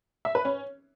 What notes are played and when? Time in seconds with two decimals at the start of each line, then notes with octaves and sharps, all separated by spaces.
0.25 E5
0.35 B4
0.45 C#4